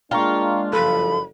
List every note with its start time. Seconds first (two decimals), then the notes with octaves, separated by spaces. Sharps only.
0.11 G#3 A#3 D4 F4 G5 A#5 C#6
0.73 F#1 G2 F3 A4 B5